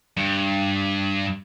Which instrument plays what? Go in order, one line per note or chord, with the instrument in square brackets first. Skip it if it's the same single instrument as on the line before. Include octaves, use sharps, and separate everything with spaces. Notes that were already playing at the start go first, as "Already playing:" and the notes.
[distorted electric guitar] G2